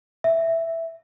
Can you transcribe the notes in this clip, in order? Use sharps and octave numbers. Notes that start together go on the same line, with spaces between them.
E5